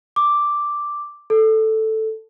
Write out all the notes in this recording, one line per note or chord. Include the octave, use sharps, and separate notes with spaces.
D6
A4